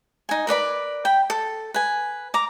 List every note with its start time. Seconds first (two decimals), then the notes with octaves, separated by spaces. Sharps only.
0.29 D#4 G#5
0.47 A#4 B4 D5 B5
1.05 G5 B5
1.30 A4
1.74 B4 G#5
2.34 A#5 D6